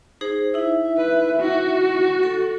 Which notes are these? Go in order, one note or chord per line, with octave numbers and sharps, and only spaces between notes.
D#4 G#4 C5
D#4 E4 E5
B4
F#4
A4